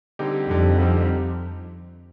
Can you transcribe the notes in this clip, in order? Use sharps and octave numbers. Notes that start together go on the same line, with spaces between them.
D3 G3 C4 D#4 G4
F2 D3 G3 C4 D#4 G4
D3 G3 C4 D#4 G4